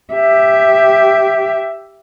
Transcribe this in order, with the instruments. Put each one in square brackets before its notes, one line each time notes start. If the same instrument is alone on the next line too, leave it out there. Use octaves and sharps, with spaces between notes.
[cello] G4 E5